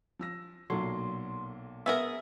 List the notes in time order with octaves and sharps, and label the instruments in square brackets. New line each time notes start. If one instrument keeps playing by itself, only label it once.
[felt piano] F3 E6 A#6
[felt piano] B1 A#2 A4 [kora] F#3 [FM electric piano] C6
[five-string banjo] B3 G#4 A#4 [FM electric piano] E5